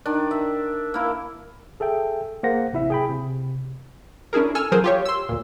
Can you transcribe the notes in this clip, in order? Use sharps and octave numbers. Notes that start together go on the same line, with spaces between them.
D#3 D4
E5
A#3 E4
G#4 A4 E5 G5
A#3 G#4 C5 F#5 A#6
A1 C3 E4 E5
G#4 G5 B5
C3
C#4 D4 E4 G#4 A#4
A4 G#5 E6 F6
F3 F#3 G#4 A#4 C5
F4 G4 C#5
C6 E6
D2 A#2